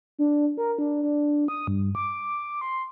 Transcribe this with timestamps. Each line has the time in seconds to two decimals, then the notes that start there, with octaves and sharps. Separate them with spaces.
0.19 D4
0.57 A#4
0.79 D4
1.03 D4
1.48 D#6
1.67 G2
1.95 D6
2.61 C6